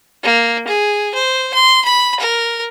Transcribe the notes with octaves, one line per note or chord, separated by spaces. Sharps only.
A#3
G#4
C5
C6
B5
A#4